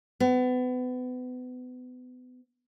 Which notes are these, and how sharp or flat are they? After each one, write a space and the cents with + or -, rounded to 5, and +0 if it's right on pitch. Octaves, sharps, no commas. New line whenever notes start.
B3 +30